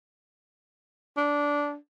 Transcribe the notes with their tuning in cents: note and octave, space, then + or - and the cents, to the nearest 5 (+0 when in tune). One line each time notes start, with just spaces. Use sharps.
D4 -15